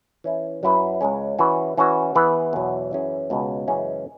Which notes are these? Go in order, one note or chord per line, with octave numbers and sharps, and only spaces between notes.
E3 C#4 E4
F#2 F#3 E4 B4
C#2 C#3 G#3 C#4
E3 C#4 F#4 B4
E3 C#4 F#4 B4
E3 B3 G#4 B4
E2 B2 F#3
F#2 E3 C#4 G#4
C#2 B2 G#3 B3
F#2 C#3 E3 G#3 C#4